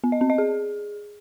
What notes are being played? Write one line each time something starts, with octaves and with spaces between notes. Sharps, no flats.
B3
D#5
C4
D#5
G#4